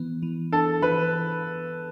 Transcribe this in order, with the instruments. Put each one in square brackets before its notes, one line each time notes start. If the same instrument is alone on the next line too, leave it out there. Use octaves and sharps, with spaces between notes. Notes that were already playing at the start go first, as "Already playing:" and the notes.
Already playing: [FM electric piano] E3 B3
E3
[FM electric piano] D4 [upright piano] A4
[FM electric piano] E3 [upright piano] B4